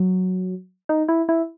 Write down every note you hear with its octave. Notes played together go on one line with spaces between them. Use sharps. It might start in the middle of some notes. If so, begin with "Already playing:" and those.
Already playing: F#3
D#4
E4
E4